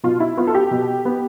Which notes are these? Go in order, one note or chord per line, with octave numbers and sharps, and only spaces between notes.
B2 F4
E4
B3 F4
A4
G4
B2
B3